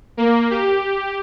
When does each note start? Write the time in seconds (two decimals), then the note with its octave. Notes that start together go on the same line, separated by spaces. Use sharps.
0.17 A#3
0.50 G4